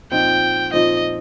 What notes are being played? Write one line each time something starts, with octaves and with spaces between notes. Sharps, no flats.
A#2 F3 C4 D#4 G5
A#2 F3 C4 D#4 D#5